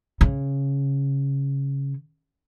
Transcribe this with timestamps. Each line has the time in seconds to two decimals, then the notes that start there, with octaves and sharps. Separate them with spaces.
0.21 C#3